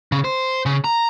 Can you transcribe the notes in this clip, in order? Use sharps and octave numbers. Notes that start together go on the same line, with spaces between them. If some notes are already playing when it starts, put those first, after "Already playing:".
C#3
C5
C#3
A#5